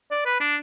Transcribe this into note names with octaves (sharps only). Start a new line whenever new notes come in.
D5
B4
D4